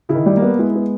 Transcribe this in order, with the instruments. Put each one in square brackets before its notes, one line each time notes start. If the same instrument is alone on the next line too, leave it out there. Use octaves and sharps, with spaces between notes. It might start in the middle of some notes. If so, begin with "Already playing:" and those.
[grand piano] C#3 [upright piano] E4
[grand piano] D#3
[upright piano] G3
[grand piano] A#3
[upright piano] B3
[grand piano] G#3 [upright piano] E4
[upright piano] B3